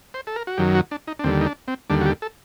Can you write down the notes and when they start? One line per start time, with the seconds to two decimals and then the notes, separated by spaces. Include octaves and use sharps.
0.14 C5
0.27 A4
0.36 A#4
0.47 F#4
0.58 F#2 D#3 F#3 G4
0.75 F#4
0.91 D4
1.08 D#4
1.19 D4
1.24 D#2 D3 G3 C4
1.41 D#4
1.46 D4
1.68 C4
1.90 D#2 D3 G3 D4
2.01 F#4
2.06 G4
2.22 A4